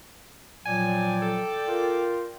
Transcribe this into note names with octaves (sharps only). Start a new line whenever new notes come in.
A#2 F3 F#3 D5 G5 G#5
A4
F4 A#4